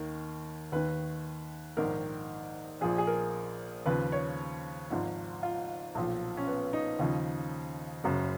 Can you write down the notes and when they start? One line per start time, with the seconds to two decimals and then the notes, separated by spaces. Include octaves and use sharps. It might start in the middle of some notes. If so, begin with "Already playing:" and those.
Already playing: D#2 D#3 A#4
0.72 D#2 D#3 B4
1.77 A#1 G#2 D#3 A#4
2.81 A#1 A#2 F3 G#4
2.98 G#4
3.07 A#4
3.86 D#2 C#3 F3 B4
4.12 C#5
4.90 G#1 G#2 F3
5.43 F4
5.95 B1 A#2 F3
6.37 C#4
6.47 B3
6.73 D#4
6.99 D#2 C#3 F3
8.04 F#1 F#2 C#3 F#4